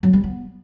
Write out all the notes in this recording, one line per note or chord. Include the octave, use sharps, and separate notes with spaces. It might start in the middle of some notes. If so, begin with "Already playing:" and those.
F#3
G3
B3